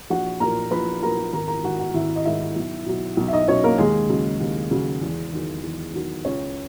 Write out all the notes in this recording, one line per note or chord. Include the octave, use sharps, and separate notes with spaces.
A#1 F#4 F#5
A#2 F#3 A#4 A#5
A#1 B4 B5
A#2 F#3 A#4 A#5
G#1 A#4 A#5
A#4 A#5
G#2 D#3 F#4 F#5
F#4 F#5
G#1 E4 E5
D#5
G#2 D#3 E4 E5
B1
B2 F#3
B1
E5
D#4 D#5
B2 F#3 C#4 C#5
A#3 A#4
D#2 G#3 G#4
C#3 F#3
D#2
C#3 F#3
E2
D#3 F#3
E2
D#3 F#3
C#2 C#4 C#5